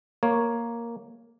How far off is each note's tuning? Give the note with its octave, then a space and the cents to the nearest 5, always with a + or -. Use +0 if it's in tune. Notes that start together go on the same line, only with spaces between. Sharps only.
A#3 +0 C#5 +0